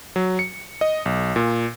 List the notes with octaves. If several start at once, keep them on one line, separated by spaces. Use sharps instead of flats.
F#3
C#7
D#5
B1
A#2